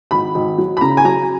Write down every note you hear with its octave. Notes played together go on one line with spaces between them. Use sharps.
G#1 B5
G#1
F#3
B5
C#3 A#5
G#5
F#3 A#5